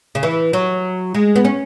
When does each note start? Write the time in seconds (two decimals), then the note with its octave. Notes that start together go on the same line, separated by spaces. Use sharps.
0.15 C#3
0.23 E3
0.53 F#3
1.15 G#3
1.36 B3
1.45 C#4